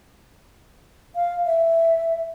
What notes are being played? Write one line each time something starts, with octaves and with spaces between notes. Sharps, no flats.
F5
E5